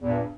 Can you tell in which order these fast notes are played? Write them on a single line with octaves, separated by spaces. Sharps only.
E2 A#2 G2